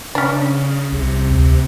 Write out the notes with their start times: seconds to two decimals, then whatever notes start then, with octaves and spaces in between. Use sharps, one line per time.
0.15 C#3 C#4 D4
0.92 C2 C3
1.31 D2